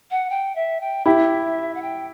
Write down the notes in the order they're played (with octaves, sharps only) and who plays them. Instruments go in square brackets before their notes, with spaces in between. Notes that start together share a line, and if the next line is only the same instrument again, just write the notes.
[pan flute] F#5
G5
E5
G5
[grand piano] E4 G4 [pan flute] E5
[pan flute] F#5
G5